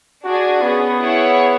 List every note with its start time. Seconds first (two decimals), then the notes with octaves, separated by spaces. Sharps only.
0.24 D4 F#4 G#4 D5 G#5
0.62 B3 C#4 G#4 B4
1.01 E4 G#4 C#5 F#5